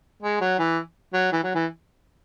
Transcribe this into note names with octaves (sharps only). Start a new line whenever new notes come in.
G#3
F#3
E3
F#3
E3
F#3
E3